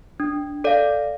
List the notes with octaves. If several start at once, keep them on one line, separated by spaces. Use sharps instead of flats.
D4
A4 D5 F5